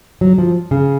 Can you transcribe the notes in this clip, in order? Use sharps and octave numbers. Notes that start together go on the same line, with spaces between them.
F#3
F3
C#3